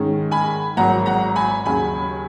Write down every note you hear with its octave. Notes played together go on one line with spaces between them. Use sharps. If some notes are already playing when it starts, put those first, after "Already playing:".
Already playing: G#2 D#3 G#3 C#4
G#5 B5
G#1 G#2 F#3 A#3 F#5 A#5
F#5 A#5
G#5 B5
D#2 C#3 F#3 C#4 G#5 B5